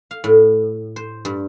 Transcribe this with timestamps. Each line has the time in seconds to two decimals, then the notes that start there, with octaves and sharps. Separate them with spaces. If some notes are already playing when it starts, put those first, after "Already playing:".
0.11 F5
0.24 A2
0.96 C5
1.25 G2